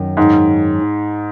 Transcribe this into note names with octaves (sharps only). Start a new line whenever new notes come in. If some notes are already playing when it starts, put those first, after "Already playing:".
Already playing: F#2 D#3
G#2